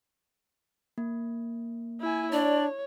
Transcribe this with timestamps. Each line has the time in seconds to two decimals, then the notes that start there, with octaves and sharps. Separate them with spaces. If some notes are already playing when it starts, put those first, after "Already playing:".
0.98 A#3
2.01 E4 G#5
2.32 D4 C#5 D5